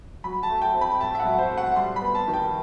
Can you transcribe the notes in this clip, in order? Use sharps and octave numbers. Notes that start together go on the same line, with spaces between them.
F#3 B5
A5
A3
G5
C4
B5
A2 A5
E5
F#5
F#3
C5
A3
F#5
G3 C6
B5
B3
A5
D#3
G5